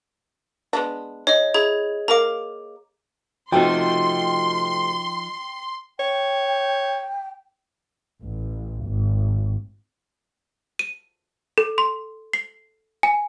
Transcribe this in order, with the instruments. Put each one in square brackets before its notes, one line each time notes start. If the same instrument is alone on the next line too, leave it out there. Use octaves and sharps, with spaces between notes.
[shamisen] G#3 B3 D4
[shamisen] D#4 G#4 [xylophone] C#5 D#5
[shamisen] E4 [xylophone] G#4 A#5 G#6
[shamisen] A#3 A#4 F5 [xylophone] A#5 D6
[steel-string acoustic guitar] C3 A3 F#4 [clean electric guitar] F3 D#4 [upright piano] G5 [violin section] C6
[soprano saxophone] C#5 [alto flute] G5
[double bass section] A1
G#1
[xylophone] D#7
A4
C6
C7
G#5